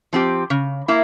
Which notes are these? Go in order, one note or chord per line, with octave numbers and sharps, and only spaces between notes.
F3 C4 G4
C#3
A#3 E4